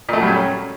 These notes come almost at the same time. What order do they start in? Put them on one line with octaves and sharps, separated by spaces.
A#2 A3 F#3 G3 C#4